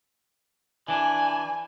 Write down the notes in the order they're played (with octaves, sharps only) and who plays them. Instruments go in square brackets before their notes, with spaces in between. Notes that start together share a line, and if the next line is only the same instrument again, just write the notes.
[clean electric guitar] E3 D4 [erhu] G#5